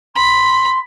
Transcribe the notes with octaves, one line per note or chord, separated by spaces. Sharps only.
B5 C6